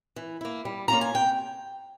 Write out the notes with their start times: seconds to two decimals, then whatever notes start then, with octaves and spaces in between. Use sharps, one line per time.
0.16 E3
0.41 A#3 E4
0.65 G3
0.88 A#3 C#4 F4 A#5
1.01 G#5
1.14 C3 G5